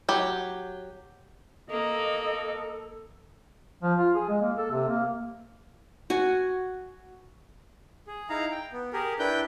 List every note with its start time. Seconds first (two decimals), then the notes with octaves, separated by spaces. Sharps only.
0.09 F#3 G4
1.70 A#3 A4 D#5
3.83 F3
3.98 F4
4.15 G#4
4.29 G#3
4.42 A#3
4.58 A4
4.71 C3
4.88 A#3
6.10 F#4 G#5
8.07 G#4
8.29 D#4 E4 F5 A#5
8.51 G5
8.72 B3
8.93 G4 G#4 A#4
9.19 D4 E4 B4 G5 G6